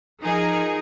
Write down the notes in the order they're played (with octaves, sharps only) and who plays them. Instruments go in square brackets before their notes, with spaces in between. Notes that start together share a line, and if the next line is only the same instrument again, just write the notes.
[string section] F3 D#4 G#4 A#4